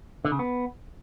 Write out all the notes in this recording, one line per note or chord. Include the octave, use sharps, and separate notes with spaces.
D3
C#3
B3